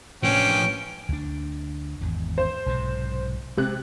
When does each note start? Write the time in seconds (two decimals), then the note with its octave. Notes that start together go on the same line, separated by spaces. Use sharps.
0.23 A1 F3 C#4 D4 G5 D7
1.09 D2 D4
2.01 G#1 E2
2.38 C5
2.66 B1 G#2 C3
3.57 C3 G#3 B3 C4 F#6